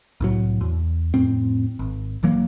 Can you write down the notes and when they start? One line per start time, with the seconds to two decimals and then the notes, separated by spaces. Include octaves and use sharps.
0.21 C2 A2 F#3
0.61 E2
1.14 F2 A2 C4
1.79 G#1
2.23 F#1 E3 F#3 A#3